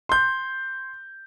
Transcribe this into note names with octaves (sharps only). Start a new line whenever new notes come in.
C6 G6